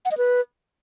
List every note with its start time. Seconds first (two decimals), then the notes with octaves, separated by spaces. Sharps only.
0.05 F#5
0.11 D#5
0.18 B4